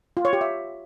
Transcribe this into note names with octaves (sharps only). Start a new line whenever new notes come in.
F4
C#5
G4
E5